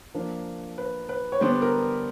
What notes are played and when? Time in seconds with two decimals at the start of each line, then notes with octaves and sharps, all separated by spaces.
0.15 F3 A#3 D4
0.78 B4
1.09 B4
1.32 C#5
1.41 D3 G3 B3 D4 C5
1.62 A#4